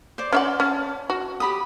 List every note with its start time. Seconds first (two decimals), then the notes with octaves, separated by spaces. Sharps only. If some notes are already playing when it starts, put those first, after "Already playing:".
0.18 C5 D5
0.33 C#4 D5 E5 F#5 G5 C6
0.60 C#4 A5
1.10 F#4
1.40 G4 B5 D#6